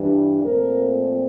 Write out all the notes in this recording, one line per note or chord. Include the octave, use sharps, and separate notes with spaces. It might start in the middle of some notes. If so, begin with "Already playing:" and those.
Already playing: G2 E3 G3 D4
A#2 F3 A3 C4 A#4